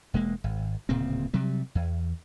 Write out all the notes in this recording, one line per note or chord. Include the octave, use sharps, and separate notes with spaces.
E1 G#3 A#3
G#1
D1 A#2 C#3 C4
C3 F#3 G3
E2